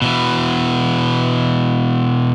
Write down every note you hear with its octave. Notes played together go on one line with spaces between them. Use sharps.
B2 E3